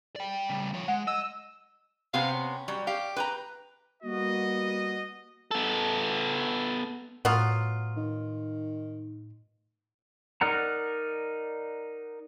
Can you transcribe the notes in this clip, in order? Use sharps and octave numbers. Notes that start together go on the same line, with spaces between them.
D5 G5
C#3 G3
F3 C#5
G#3 F#5
D#5 E6
C3 B3 C4 F5
C#4
F#3 G3
G4 F5
B4 G5 A#5
G3 A#3 B3 F#4 D#5
B3 A4
A2 F#3 B3 F4
D#3
D#4 A#4 D5 F#5 A#5